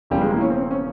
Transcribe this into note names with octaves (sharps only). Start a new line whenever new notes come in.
E1 E2 C#3 F3 G3
G#3
A#3
E4
C#4
C4
C4
C#4